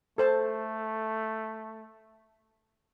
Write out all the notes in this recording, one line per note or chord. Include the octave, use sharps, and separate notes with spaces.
A3 A4 C5 A5